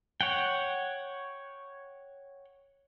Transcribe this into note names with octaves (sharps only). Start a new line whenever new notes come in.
C#5 F#5 G5